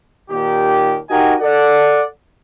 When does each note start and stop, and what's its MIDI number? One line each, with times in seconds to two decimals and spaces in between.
0.30 0.97 39
0.30 0.97 46
0.30 0.97 51
0.30 0.97 67
1.09 1.34 63
1.09 1.34 66
1.09 1.34 67
1.09 1.34 70
1.09 1.34 75
1.09 1.34 80
1.40 2.03 69
1.40 2.03 74
1.40 2.03 78